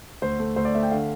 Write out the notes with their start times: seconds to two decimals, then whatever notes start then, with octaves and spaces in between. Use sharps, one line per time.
0.22 D2 C5
0.39 A3
0.56 D2 C5
0.65 D5
0.74 A3 E5
0.83 G5
0.91 D3 F5